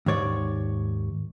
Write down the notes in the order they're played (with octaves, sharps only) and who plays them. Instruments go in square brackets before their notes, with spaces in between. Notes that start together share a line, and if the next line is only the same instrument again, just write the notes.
[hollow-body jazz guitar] D#2 G#2 C#5 D5